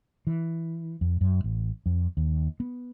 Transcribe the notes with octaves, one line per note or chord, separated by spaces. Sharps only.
E3
F2
F#2
A1
F2
D#2
B3